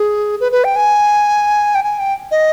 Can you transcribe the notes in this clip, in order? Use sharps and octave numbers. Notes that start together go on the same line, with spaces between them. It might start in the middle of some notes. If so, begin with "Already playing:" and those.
Already playing: G#4
B4
B4
G5
G#5
G5
G#5
G5
D#5